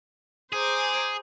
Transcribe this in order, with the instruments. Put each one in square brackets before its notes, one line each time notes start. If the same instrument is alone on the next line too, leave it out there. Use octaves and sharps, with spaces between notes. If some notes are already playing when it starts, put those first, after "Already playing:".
[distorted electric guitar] G#4 [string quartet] C5 A#5 D6